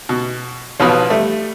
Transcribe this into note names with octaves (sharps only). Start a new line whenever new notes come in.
B2
A1 B2 F3 B4 D#6
G3 A3